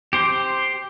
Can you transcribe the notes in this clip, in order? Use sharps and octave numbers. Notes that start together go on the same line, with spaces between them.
G4 C5